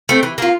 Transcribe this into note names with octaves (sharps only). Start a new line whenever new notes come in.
A3 C4
E3
A#3 F4